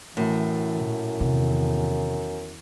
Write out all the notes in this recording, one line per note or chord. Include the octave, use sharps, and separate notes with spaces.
F#2 A2 E3
A#2
E2 C3 D#3